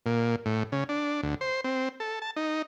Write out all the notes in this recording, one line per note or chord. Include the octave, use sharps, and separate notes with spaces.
A#2
A2
C#3
D4
D2
C5
C4
A4
A5
D#4